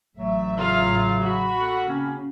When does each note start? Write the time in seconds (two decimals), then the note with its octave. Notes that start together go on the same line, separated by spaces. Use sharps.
0.16 A1 F#3 A3 E5
0.57 C#3 F#3 F4 F5
1.22 F#4 B5
1.58 A#3 A4 F#5
1.88 C#3 A#3 C4 C#4